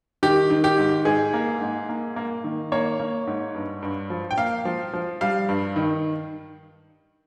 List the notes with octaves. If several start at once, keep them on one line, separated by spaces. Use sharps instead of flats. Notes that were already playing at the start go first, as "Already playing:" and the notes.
D#3 G4
D#3
G4
G#2
G#2 G#4
A#3
G#2
A#3
A#3
D#3
A#3 C#5
A#3
G#2
G2
G2
F3
G5
A#3 F5
F3
F3
G3 F5
G2
D#3